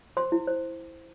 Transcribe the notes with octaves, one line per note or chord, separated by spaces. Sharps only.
C5 C6
E4
C5